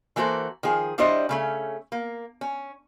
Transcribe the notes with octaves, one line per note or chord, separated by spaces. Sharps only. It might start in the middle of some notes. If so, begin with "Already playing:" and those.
E3 A#3 F#4 A4 C5
D#3 F3 G#4
G3 D4 E4 F#4 C5 D#5
C#3 A3 C#4
A#3
C#4